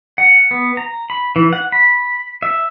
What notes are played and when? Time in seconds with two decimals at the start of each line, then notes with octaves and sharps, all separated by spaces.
0.18 F#5
0.51 B3
0.77 A#5
1.10 B5
1.36 E3
1.53 F#5
1.72 B5
2.43 E5